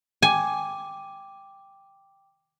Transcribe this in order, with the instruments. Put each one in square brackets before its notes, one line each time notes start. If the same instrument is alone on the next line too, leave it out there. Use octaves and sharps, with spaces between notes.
[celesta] G5 D6 [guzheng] G#5